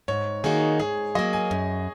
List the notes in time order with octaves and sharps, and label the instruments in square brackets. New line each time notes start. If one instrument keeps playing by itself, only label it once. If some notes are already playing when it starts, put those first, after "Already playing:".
[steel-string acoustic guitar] G#2 [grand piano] C#5
[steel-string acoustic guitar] D#3 A#3 D#4 F#4 [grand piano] G#4
[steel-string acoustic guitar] G#2 [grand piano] G#4
[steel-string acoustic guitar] F#3 A#3 [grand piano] D#5
[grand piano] G#5
[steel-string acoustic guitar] F#2